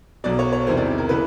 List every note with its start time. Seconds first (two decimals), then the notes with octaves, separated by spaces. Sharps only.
0.24 B1 B2 F#3 D5
0.39 C#5
0.53 C#5
0.66 E1 E2 C3 D#3 C5
0.77 D5
0.98 A#4
1.09 C#3 E3 B4